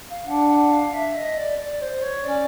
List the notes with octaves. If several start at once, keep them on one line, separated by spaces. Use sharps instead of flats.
F5
D4 F#5
F#5
F5
E5
D#5
D5
D5
C5
C#5
C#4 D5